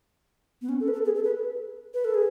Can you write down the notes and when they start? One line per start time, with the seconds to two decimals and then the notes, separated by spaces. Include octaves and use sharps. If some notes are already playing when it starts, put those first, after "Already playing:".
0.62 B3
0.69 C#4
0.80 A4
0.88 B4
0.93 A4
1.05 G#4
1.15 A4
1.24 B4
1.94 B4
2.05 A4
2.14 G#4